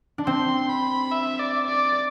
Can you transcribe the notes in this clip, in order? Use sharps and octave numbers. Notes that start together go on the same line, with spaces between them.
D4
C4 C6
B5
E5
D5
D5